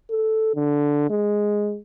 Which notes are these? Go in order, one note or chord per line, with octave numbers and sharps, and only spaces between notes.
A4
D3
G#3